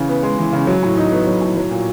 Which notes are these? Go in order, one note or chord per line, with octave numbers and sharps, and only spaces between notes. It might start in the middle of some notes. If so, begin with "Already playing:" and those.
Already playing: C#3 E3
B3
G#3
E3
C#3
F#3
A2
D#4
B3
F#3
A2
F#3
A#2